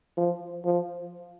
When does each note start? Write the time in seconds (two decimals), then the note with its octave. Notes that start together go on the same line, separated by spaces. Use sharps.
0.17 F3
0.65 F3